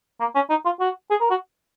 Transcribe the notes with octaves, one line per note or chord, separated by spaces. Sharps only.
A#3
C#4
D#4
F4
F#4
G#4
A#4
F#4